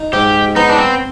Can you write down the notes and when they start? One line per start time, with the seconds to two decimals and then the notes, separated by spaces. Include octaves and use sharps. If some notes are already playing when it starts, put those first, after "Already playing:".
Already playing: D#4
0.13 G#2 G4
0.56 B3 D#4
0.69 D4
0.78 C4